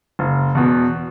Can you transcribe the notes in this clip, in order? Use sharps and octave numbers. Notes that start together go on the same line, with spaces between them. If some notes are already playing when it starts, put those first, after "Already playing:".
F#1
E2 B2